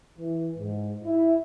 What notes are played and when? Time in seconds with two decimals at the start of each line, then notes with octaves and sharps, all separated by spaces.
0.19 E3
0.59 G#2
1.05 E4